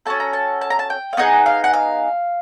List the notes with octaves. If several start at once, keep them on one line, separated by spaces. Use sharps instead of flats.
C#4 F#4 A4 A5
A#5
A5
A5
A#5
A5
G5
F5
B3 D#4 G#4 F#5
F5
F#5
F5